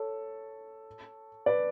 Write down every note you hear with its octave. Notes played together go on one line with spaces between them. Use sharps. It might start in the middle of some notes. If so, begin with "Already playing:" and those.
Already playing: A4 C#5
B4 D5